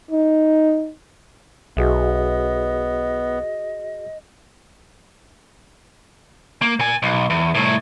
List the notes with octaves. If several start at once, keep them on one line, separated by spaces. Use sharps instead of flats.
D#4
B1 B3 F#4 G#4 D#5 E5
A#3
A#2 G#5
B1
E2
C2 A2